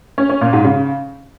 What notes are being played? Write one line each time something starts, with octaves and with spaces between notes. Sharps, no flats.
C#4
C#4
A#2
G#2
C#3